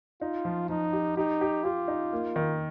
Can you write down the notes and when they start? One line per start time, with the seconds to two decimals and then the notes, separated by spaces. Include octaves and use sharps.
0.21 D#4 F4
0.45 F3
0.69 F3 D#4
0.93 G4
1.17 D#4 G4
1.41 G4
1.64 F4 G4
1.88 D#4
2.13 A#3
2.36 D#3